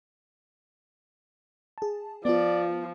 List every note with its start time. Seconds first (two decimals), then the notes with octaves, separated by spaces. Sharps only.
1.78 G#4 A5
2.25 F3 B3 F4 D5